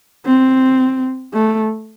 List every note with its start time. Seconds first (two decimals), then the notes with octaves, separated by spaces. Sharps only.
0.26 C4
1.34 A3